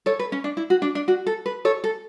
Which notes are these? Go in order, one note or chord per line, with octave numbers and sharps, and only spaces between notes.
A4 C#5
B4
C#4
D4
E4
F#4
D4
D4
F#4
A4
B4
A4 C#5
A4